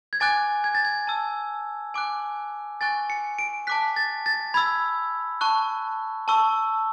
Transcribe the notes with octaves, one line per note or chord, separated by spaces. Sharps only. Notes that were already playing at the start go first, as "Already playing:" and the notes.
G#6
G#5 D6 F#6 A6
G#6
A6
G#6
A5 E6
G#5 D6 F#6
G#5 C#6 F#6 A6
C#7
D7
A5 D6 F#6 B6
A6
A6
B5 E6 G#6
A5 C#6 F#6
A5 C#6 E6